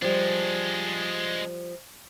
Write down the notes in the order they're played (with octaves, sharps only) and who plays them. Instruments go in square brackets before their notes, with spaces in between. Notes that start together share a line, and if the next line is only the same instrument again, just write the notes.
[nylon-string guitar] F3 G3 [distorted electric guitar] G#3 D4